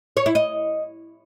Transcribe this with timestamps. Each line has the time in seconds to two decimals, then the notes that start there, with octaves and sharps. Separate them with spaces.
0.17 C#5
0.26 E4
0.35 D#5